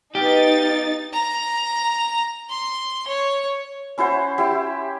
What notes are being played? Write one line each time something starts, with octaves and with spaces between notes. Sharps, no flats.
B2 D#4 F#4 G4 F5 A6
A#5
C6
C#5
C#4 E4 F#4 C5
E4 G4 E5